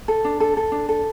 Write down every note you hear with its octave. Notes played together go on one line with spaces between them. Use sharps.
A4
D4
A4
A4
D4
A4